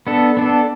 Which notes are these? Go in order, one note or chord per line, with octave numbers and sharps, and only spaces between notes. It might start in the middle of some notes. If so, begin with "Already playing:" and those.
B3 D4 A4
B3 D4 A4